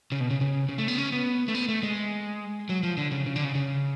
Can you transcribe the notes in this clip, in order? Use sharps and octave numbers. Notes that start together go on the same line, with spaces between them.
C#3
B2
C#3
C#3
C#3
A3
B3
C#4
B3
A3
B3
A3
G#3
F#3
F3
D3
C#3
C#3
D3
C#3
C#3